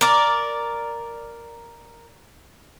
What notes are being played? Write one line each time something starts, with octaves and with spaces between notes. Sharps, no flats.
A#4 D5